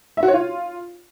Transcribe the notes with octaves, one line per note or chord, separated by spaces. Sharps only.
E5
F#4
C#5
F4